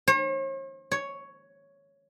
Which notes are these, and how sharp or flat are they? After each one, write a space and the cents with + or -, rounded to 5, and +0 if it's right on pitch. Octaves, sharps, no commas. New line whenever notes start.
C#5 -45
C#5 +5